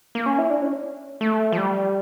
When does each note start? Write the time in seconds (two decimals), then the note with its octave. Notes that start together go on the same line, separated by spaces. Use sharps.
0.15 A#3
0.26 C#4
0.38 E4
0.50 D4
0.62 C#4
1.21 A3
1.52 F3
1.57 G3